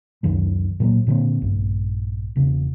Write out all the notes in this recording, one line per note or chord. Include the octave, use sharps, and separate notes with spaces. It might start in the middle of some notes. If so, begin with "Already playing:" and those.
C#2 F#2 D#3 F#3
A#2 F#3 G#3 A#3
A#2 D3 A#3 C4
A#1 G2
E1 C#3